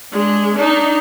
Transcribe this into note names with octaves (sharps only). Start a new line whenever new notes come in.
G#3 D4
D4 D#4